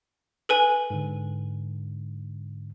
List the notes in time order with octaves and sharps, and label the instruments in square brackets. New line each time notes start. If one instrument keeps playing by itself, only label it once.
[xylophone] A4 B4 G#5
[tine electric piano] G#2 D3